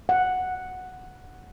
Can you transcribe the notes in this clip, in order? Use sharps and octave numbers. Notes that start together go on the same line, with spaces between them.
F#5